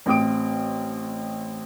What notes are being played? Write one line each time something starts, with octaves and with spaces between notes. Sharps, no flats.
A1 C4 G5 D#6 D7